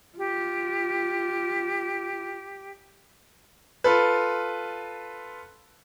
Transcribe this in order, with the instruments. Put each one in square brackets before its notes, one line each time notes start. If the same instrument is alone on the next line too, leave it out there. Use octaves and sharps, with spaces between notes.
[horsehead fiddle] F4 [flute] G4
[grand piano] F4 A4 B4